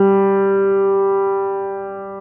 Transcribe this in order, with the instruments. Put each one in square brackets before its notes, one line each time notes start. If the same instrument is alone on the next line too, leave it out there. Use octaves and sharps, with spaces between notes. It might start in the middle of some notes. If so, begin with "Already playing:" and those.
Already playing: [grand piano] G3